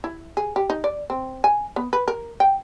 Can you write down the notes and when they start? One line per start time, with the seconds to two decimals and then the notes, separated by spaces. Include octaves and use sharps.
0.04 E4
0.37 G#4
0.56 G4
0.70 D#4
0.84 D5
1.10 C4
1.44 G#5
1.76 B3
1.93 B4
2.08 A#4
2.40 G5